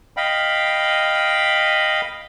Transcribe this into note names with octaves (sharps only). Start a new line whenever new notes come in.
D#5 F5 G5 B5